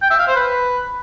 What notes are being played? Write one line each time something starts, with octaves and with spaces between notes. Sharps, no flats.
G5
E5
F5
C5
B4